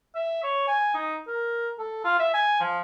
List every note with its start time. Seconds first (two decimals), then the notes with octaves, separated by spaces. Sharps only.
0.15 E5
0.43 C#5
0.68 G#5
0.94 D#4
1.27 A#4
1.79 A4
2.04 F4
2.19 E5
2.34 G#5
2.60 F3